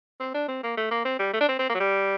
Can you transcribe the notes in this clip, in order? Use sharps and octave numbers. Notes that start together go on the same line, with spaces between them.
C4
D4
C4
A#3
A3
A#3
C4
G3
A3
D4
C4
C4
A#3
F#3
G3